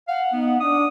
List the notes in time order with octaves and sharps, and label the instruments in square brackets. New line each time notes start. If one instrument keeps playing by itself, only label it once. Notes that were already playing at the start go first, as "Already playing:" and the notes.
[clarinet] F5 [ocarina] F#5
[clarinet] B3 [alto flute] D#4
[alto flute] D4 [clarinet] D#6